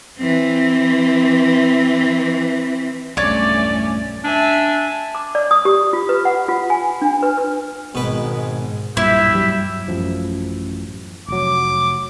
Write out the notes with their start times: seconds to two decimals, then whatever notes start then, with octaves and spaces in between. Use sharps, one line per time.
0.19 E3 C4
3.17 B1 E2 G2 A3 C#4 C#5 D5 D6
4.24 D4 E5 G#5
5.15 D6
5.35 D5
5.51 D#6
5.65 G4
5.93 F4
6.09 B4
6.25 F#5
6.48 F4
6.70 G#5
7.02 D4
7.23 B4
7.37 B4
7.95 G#1 B2 G#3 B4
8.97 B1 G2 A#2 E4 G4 E5
9.33 G2 F#3 G3
9.88 A1 F#2 F3
11.28 F1 F#3 D6